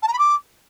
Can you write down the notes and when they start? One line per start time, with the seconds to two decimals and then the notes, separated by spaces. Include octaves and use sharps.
0.02 A5
0.08 A#5
0.13 B5
0.18 D6